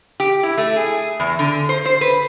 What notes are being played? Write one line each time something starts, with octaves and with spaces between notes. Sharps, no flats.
G4
E4
A3
G#4
E2
D3
C5
C5
B4